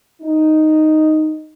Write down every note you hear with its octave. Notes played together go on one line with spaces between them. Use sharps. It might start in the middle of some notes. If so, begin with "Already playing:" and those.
D#4